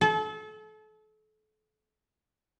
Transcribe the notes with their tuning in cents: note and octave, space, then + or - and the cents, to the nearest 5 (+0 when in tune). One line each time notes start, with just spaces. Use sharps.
A4 -35